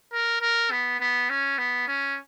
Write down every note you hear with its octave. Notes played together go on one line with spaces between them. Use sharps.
A#4
A#4
B3
B3
C#4
B3
C#4